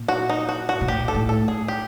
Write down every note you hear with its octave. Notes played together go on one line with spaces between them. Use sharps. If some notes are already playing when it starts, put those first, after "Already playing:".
Already playing: A#2
F#4
D#4
F#4
F#4
B2
A#2 G4
A4
A2
A4
G#4
G4